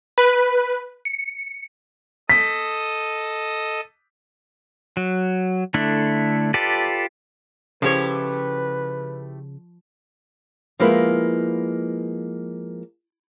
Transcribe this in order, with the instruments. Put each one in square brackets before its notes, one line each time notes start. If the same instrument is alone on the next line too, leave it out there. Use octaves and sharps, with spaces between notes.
[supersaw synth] B4
C#7
[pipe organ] A4 D#5 D#6 [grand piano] B6
[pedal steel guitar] F#3
D3 A3 D4 E4
F4 G4 A4 B4 D5
[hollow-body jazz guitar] C#3 [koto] F3 C#5 [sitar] A3 E4 G4 [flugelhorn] B4
[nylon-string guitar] F3 G#3 A#3 B3 E4 B4